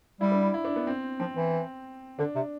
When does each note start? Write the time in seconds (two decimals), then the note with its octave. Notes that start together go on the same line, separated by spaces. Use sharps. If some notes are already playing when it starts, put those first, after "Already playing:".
0.21 G3 E4
0.32 D4
0.43 E4
0.54 E4
0.65 D4
0.76 B3
0.87 C4
1.20 F3 C4
1.36 E3
2.19 D3 D4
2.35 C3